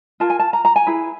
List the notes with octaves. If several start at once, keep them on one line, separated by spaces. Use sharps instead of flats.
F4 A#4 A5
G#5
A5
A#5
A#5
G#5
E4 G#4 B4